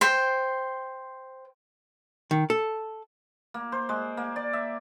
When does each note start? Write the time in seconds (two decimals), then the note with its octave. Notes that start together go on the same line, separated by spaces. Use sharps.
0.01 C5 G5
2.31 D#3
2.50 A4
3.54 A#3
3.72 C5
3.89 G#3
4.17 A#3
4.36 D5
4.53 E5